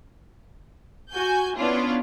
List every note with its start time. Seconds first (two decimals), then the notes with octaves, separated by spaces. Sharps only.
1.11 F#4 G#5 G6
1.55 B3 C#4 D4 E4 F4